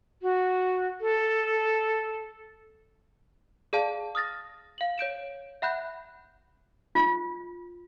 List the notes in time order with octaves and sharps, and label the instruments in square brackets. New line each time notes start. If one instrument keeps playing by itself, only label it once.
[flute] F#4
A4
[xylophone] G#4 D5 F5 A5
D#6 F6 A6 A#6
F5 F#7
C#5 G6 D7 E7
E5 F#5 B5 F#6 G6
[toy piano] F4